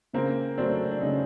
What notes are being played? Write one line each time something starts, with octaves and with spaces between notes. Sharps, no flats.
C#3 A#3 C4
F#3 A3 C4 D4
D4
C#3 C#4 D#4